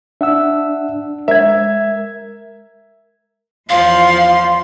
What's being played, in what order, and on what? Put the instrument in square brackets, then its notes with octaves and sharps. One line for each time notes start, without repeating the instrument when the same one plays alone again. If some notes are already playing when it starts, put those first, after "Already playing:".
[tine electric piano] D4 [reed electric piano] E5 F#5 E6
[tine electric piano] G#3 G#6 [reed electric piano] A#4 [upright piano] E5
[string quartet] E2 F3 C6 [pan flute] F5